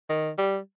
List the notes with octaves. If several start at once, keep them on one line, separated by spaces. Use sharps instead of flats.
D#3
G3